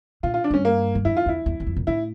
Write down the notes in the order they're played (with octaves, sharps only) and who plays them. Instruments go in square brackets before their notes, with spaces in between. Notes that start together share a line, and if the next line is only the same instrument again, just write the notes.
[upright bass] A#2 [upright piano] F4
[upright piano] F4
D4
[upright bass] G2 [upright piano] C#4
[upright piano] A#3
[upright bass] E2
[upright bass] F2 [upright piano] E4
[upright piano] F4
[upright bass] E2 [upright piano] E4
[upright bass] E2
E2
F2
A#2
[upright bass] A2 [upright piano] E4